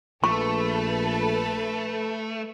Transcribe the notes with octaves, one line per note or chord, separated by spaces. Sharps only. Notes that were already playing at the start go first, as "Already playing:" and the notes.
A#1 A3 A4 B4 C#6